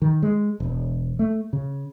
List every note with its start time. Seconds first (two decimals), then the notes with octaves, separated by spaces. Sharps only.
0.02 D#3
0.22 G#3
0.60 E1
1.19 A3
1.53 C#3